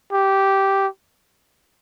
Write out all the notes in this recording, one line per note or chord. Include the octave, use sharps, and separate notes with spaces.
G4